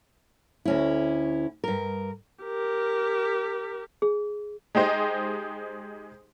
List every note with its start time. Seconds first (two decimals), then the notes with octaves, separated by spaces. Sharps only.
0.65 D2 C#4 E4
1.64 G2 A#4
2.44 G4 A#4
4.02 G#4
4.75 G#3 D#4 G4 C5 D#5